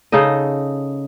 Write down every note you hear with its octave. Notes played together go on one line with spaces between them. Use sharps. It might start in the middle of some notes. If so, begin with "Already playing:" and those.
C#3 D#4 A4 D#5